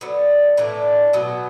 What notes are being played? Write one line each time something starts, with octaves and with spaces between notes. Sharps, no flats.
D3 F#3 B3
A2 E3 A3 D4
B2 F#3 B3